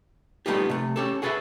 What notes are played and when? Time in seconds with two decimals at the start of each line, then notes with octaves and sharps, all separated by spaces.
0.46 G3 A3 B3 D#4 F4 G4
0.69 C3 A3
0.96 C#4 G4 A4
1.22 F#4 G#4 A4 B4 D#5 E5